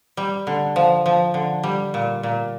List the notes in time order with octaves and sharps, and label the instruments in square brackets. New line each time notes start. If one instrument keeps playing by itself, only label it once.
[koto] G3
D3
F3
F3
D3
G3
A#2
A#2